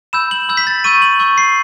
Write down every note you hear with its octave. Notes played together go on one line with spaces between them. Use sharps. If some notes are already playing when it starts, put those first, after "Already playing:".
B5 E6 G6 E7
F#7
B5 E6 G6
B6
A6
C#6 E6 G6 D#7
F#7
C#6 E6 G6
C7